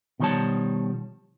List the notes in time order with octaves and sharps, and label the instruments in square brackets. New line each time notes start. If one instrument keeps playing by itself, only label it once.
[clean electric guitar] B2 D#3 F3 G3 C#5 A5